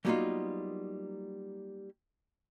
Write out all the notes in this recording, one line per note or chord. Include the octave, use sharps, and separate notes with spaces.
F#3 G3 A#3 B3 D#4 F4